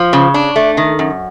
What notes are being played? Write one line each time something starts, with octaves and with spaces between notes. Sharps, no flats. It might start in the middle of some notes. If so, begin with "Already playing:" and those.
Already playing: F3
C#3
D4
A3
D#3
F#2